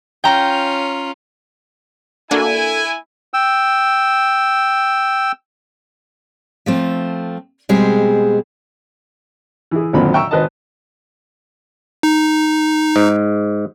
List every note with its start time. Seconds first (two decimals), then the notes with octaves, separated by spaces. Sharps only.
0.24 C#4 F4 G5 A#5
2.31 A#3 D4 E4 F#4 A4 G#5
3.34 G5 E6
6.66 F3 A3 C4
7.69 B2 G3 G#3 C4 G#4
9.71 E3 E4 G#4
9.93 G#1 F#2 A#2 D3 C4 B5
10.13 E5 G5 A#5 C#6 E6
10.31 G#1 B4 C5 D#5 A5
12.03 D#4
12.96 G#2